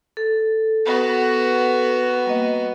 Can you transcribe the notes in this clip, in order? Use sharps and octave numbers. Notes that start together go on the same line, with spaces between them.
A4
B3 F#4
G3 A#3 D#5